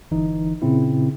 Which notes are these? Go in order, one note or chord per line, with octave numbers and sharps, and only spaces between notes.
G1 E3 D#4
A#2 C#3 C4 E4